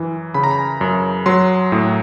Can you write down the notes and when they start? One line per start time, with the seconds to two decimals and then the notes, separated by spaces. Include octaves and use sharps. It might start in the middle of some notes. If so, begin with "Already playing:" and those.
Already playing: F#2 E3
0.34 C#3 B5
0.44 A#5
0.51 B5
0.81 F#2
1.26 F#3 C6
1.72 A2